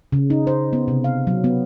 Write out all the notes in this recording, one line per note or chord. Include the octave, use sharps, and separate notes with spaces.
C#3
D#4
C5
B3
C3
F5
F#3
B3